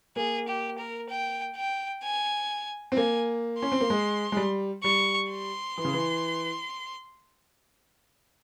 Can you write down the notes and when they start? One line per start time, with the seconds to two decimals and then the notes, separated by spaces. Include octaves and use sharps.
0.16 A#3 G#4
0.48 G4
0.78 A#4
1.10 G5
1.56 G5
2.03 G#5
2.92 C4
2.96 A#3 G#5
3.59 C#4 C6
3.72 C4
3.81 A#3
3.90 G#3
4.32 G#3
4.37 G3
4.84 G3 C#6
5.31 C6
5.77 E3
5.85 C#3
5.93 E3